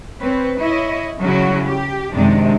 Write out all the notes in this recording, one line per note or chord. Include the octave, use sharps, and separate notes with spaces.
C4 B4 C#5
E4 C#5 D#5
C#3 F#3 G3 C#4 E4 F#4
G4
F#2 C3 D#3 G#3 D4